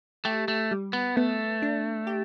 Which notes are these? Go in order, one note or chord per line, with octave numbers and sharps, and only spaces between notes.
A3 G4
A3
G3
B3
A3 B3
D4
G4